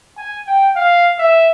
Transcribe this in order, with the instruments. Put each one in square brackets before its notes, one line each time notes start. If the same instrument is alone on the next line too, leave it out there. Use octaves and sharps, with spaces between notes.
[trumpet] G#5
G5
F5
E5